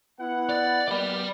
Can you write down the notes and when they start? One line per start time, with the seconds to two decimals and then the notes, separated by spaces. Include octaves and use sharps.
0.19 B3 E4 F#5
0.49 D5
0.88 A#3 B3 G4 D5 B5